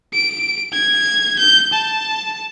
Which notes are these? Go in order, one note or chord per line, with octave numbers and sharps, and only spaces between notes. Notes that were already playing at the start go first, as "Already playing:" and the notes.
D7
G#6
G6
A5